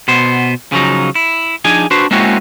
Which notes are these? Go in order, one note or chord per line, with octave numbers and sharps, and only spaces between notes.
B2 B3 C5
C#3 F3 F#3 D#4
E4
F3 D4 D#4 G#4 G#5
D4 F#4 B4 C5
G#3 A#3 C4 C#4 E4 F#4